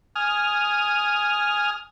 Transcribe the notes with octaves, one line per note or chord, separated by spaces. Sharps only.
G#5 D#6 F6